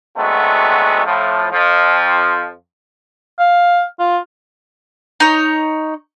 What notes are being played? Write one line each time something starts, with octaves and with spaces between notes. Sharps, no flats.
D2 F#3 G#3 A3 B3 C4
A2 F3
F2 F3
F5
F4
D#4 C#5